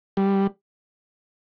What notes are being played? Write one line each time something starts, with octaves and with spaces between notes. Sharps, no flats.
G3